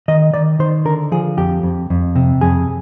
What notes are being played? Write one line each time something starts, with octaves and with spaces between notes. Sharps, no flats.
D#3 D#5
D#3 D5
D#3 C5
D3 A#4
F3 G#4
F2 G4
F2
F2
C3
F2 G#4